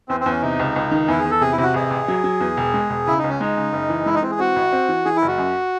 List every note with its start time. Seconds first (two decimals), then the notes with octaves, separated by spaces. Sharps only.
0.09 E2 C4
0.20 C4
0.26 E2 C#4
0.42 C3 D#4
0.59 C#2
0.76 C#2
0.91 D#3
1.08 E2 E4
1.19 G#4
1.25 E2
1.31 A4
1.41 C3 G#4
1.53 E4
1.58 C3 F#4
1.74 A1 G#4
1.91 A1
2.08 F#3
2.24 F#3
2.40 E2
2.57 E1
2.74 G#3
2.90 E1
3.07 C#3 E4
3.18 D#4
3.24 C#2
3.29 C#4
3.40 G#3 D#4
3.57 C#3
3.73 F#1
3.90 E3
4.06 G#3 E4
4.15 D#4
4.23 E3 C4
4.31 G#4
4.39 C4 F#4
4.56 A1
4.73 C4
4.89 E3
5.05 E3 G#4
5.16 E4
5.22 F#1
5.28 F#4
5.38 F#2